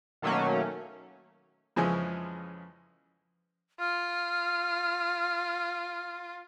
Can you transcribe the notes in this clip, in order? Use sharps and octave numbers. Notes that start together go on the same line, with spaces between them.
B2 D#3 F#3 A3 A#3 C#4
F2 C#3 E3 F3 G#3 C#4
F4 F6